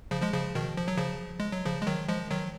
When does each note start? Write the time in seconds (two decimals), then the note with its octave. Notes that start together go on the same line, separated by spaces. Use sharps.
0.11 C#3 F3
0.22 F3 G#3
0.33 C#3 F3
0.55 B2 D#3
0.77 F3
0.88 F#3
0.98 C#3 F3
1.40 G#3
1.52 F#3
1.65 C#3 F3
1.82 G#3
1.87 D#3 F#3
2.09 F3 G#3
2.31 D#3 F#3